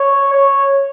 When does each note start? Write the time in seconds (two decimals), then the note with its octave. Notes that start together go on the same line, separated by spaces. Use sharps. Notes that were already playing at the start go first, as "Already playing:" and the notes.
Already playing: C#5
0.33 C#5